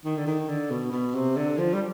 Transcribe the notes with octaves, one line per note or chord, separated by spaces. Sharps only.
D#3
D3
D#3
D3
B2
B2
C3
D3
F3
G3